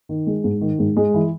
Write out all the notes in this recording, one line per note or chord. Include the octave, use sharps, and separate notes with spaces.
D#3
G#3
G#2
D#3
G#2
G#3
E3